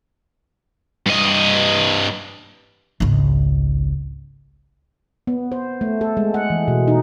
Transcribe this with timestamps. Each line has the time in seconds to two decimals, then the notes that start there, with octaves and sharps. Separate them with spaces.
1.06 G2 D#5
3.00 G#1 C#2
5.27 B3
5.52 C5
5.81 A3
6.01 A4
6.17 G#3
6.34 F#5
6.50 E3
6.68 B2
6.88 D#4